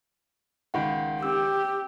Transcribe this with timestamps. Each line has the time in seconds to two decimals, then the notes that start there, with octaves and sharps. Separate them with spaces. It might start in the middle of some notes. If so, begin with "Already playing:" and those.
0.74 C#2 D#3 F#5 B5
1.23 C#4 G4 E6